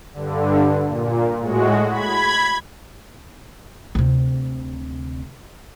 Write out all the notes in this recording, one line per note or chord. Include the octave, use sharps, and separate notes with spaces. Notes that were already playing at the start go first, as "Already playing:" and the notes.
G2 D3
A#2
A2 G#3 F#4
B5 G#6
D2 C3